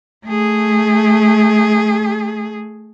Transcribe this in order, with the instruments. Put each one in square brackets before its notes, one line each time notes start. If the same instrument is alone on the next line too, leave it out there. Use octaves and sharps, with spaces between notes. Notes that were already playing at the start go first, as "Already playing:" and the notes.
[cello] A3 G#4